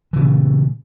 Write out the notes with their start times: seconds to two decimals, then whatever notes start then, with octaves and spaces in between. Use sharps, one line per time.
0.13 E3
0.16 C#3
0.18 A#2
0.21 A3